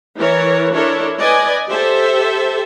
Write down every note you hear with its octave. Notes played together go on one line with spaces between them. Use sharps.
E3 A#4 C#5
D4 E4 A4 A#4 C#5
B4 D5 D#5 G#5
G4 A4 C5 E5